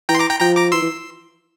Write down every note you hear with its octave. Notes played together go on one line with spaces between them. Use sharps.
E3 G5 A#5
C6
A#5 D6
G5 A#5
F3 G5 A#5
A#5 D6
E3 C6 E6
E3